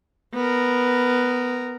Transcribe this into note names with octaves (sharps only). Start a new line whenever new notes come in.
B3 A#4